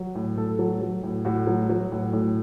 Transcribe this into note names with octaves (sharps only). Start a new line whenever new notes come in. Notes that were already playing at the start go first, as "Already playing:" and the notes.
Already playing: F#3
A2
A2 A4
F#3
F#3
A2
A2 F#4
F#3
F#3
A2
A2